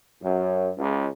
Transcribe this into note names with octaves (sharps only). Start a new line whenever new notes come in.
F#2
C#2